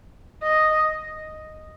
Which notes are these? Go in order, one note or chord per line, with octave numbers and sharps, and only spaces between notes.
D#5